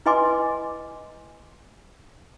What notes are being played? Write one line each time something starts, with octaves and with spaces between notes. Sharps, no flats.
E4 B4 D#5 G#5 C6 D6